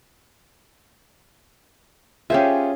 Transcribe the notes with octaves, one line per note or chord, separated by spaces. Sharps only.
C#4 F4 G4 G#4 C5 E5